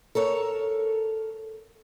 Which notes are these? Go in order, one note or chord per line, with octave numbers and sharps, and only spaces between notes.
A4 A#4 C#5